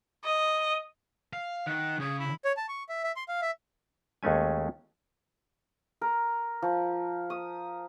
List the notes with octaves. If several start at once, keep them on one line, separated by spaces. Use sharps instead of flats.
D#5
F5
D#3 F#5
C#3 G#4
E4
C#5
A5
C#6
E5
E5
C6
F5
E5
D#2 G#3 A3 C#4 G#5
A#4
F3
D#6